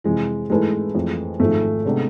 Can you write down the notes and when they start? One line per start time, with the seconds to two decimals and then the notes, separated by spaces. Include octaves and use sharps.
0.04 F2 C3 E3 G#3
0.50 G#2 E3 G#3 A3 E4 B4
0.95 F2 E3 A3
1.39 G#1 G#2 F3 A3
1.85 C3 G#3 B3 D4